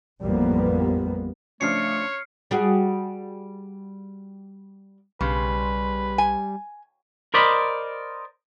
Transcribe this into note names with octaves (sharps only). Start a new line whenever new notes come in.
A1 F2 G3 A#3 B3
C#3 F3 A3 D4 C#5 F6 C7 C#7
G3 F#4 G#4
B1 C#3 G3 B4 C6
G#5
A#4 C5 D5 D#5 B5